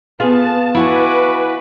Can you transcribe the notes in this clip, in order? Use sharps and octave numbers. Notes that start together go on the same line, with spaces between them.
B3 F4 G#4 A5
E4 F#4 B4 F#5 G#5 D6